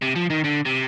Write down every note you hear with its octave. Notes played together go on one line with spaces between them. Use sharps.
C3
F3
D#3
D3
C3